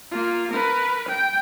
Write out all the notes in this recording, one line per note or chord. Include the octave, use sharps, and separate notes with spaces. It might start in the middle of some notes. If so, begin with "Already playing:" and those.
A#3 F4
A#4 B4
G5